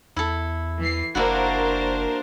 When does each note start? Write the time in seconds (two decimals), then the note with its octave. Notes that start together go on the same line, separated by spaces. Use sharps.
0.16 E2 E4 A4
0.79 E3 C7
1.15 F#1 A#3 D4 E4 F#4 A#4 C5